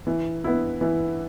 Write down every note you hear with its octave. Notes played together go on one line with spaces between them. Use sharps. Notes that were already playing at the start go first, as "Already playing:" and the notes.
E3
B3 E4
E3